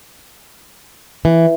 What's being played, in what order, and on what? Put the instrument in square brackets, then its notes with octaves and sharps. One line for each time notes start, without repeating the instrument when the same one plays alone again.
[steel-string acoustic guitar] E3